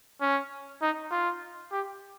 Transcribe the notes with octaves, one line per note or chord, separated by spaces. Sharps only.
C#4
D#4
F4
G4